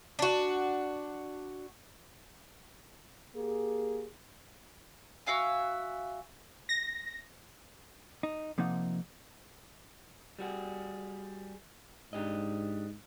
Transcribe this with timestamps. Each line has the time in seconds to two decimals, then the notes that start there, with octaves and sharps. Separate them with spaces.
0.19 D4 F#4
3.36 A#3 G4 G#4
5.26 F#4 E5 F5 G#5
6.69 A#6
8.23 D#4
8.58 C3 F3 A#3 D#4 F#5
10.39 G3 F#4 G#4
12.13 G#2 D4 G4 D#5